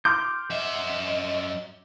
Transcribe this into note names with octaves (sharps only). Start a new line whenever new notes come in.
C6 D6 F6 G6
F#2 D#5 E5